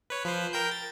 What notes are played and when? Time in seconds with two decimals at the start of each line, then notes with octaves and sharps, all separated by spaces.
0.10 B4 C#5
0.25 F3 B4 C5
0.53 A#4 G5 G6
0.71 A6